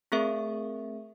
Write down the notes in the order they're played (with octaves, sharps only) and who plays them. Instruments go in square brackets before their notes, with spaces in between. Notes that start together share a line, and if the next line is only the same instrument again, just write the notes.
[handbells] A3 C4 G#4 A#4 E5